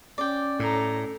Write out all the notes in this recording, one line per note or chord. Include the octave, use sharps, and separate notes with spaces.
C#4 D5 G5
A2 A4 A#5